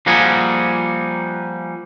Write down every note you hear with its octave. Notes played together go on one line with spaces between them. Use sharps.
F3 G3 A#3 F#4 G#4